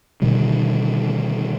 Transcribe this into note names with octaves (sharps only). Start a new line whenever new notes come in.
B2 D3 D#3 G3